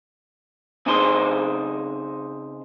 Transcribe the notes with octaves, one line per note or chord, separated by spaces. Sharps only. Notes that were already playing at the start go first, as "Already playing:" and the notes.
C#3 C4 D#4 G#4 C5 C6